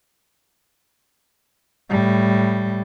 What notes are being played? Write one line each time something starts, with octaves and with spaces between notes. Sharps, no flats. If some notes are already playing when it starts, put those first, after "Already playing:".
A2 G3